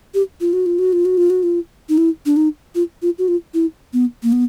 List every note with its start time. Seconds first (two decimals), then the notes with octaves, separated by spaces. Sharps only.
0.14 G4
0.41 F4
0.53 F#4
0.66 F4
0.79 F#4
0.93 F4
1.05 F#4
1.17 F4
1.30 F#4
1.43 F4
1.89 D#4
1.98 E4
2.26 D4
2.36 D#4
2.75 F4
3.02 F4
3.18 F#4
3.28 F4
3.54 E4
3.93 B3
4.23 A#3
4.32 B3